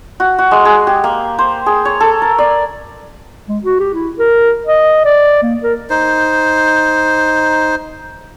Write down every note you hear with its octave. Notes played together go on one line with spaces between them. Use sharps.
F#4
F#4
G#3
G#4
G4
A#3
C5
G#4
C#5
A4
A#4
D5
G#3
F#4
G4
E4
A#4
D#5
D5
A#3
A#4
D#4 C5